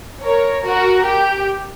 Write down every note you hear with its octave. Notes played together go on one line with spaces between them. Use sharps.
A#4 C#5
F#4 A#4
G4